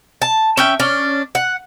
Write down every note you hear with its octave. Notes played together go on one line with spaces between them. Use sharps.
A5
C#4 E5 G5
C#4 D4
F#5